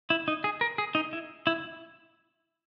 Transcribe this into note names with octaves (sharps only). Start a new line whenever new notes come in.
E4
D#4
G#4
A#4
G#4
D#4
E4
E4